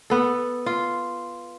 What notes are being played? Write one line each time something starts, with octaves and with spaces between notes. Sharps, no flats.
B3 A4
F4